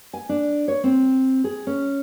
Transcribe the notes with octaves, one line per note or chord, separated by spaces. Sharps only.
G#5
D4
C#5
C4
G#4
C#4